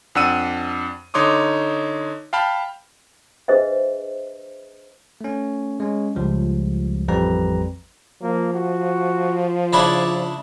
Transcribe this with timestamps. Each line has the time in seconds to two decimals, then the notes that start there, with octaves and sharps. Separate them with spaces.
0.15 F2 D4 F#5 E6 D#7
1.14 D3 D#4 C#5 C6 D6 D#6
2.33 F5 G5 A5 B5 F6
3.48 D4 G#4 B4 C5 D#5 E5
5.21 A3 C#4
5.80 G#3 C#4
6.15 C#2 F3 G3
7.08 A1 F2 G3 C4 B4 A#5
8.22 F3 A#3
8.53 F#4
9.73 C#3 D4 E4 D5